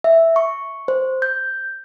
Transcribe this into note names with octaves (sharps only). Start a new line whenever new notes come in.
E5
C#6
C5
G6